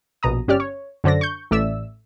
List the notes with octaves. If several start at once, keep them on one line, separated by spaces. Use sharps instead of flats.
A#1 B2 A#5 D#6
G1 C#4 G4 D5 F6
C#5
F#2 D3 C5 D5 A#6
C#6 G6
A1 A3 D5 E5 E6